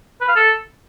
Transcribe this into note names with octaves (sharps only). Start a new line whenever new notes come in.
B4
F5
A4